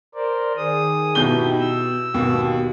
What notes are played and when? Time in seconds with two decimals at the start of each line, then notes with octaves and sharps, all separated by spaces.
0.15 A#4 C5 D5
0.57 D#3 G#4 D#6
1.15 B2 D#4 E4 G4 G6 G7
1.60 E6
2.14 D#2 B2